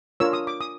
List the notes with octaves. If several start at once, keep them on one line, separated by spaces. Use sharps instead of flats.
D4 F4 A#4 C#5 E6
D#6
D6
D#6